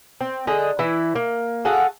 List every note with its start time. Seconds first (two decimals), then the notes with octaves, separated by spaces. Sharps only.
0.21 C4
0.47 D3 G#4 D#5
0.79 E3 E4
1.15 A#3
1.65 F#4 G#4 A4 F5